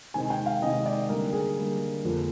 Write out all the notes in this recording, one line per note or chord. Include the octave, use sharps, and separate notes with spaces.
C3 D#3 G#3 C4 D#4 G#5
G5
F5
C3 D#3 G#3 C4 D#4 D#5
D5
D3 G3 A#3 A#4
G#4
D3 G3 A#3
F2 D3 F3 A#3 D4